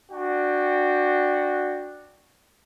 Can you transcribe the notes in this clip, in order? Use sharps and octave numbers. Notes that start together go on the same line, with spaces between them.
D4 F#4 G5